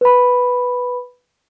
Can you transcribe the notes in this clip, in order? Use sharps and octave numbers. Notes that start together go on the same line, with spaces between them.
B4 B5